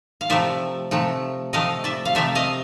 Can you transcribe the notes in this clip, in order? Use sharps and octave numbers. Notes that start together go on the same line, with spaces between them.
F5
C3 F3 A3 D5 E5
C3 F3 A3
C3 F3 A3 D#5 F5
D5 E5
F5
C3 F3 A3 D5 E5
D#5 F5